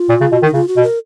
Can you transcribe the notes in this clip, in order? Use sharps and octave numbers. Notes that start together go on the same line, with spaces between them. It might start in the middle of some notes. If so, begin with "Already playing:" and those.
Already playing: F4
A#2
C#3
B2
D#3
D#4
C#3 F4
F#4
B2
A#4